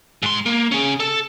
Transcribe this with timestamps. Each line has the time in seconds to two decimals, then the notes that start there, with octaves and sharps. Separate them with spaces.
0.23 G#2 C6
0.46 A#3
0.71 C#4 G#4
1.00 A4